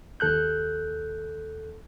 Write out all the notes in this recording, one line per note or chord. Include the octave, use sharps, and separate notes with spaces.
D#2 A4 F#6 G6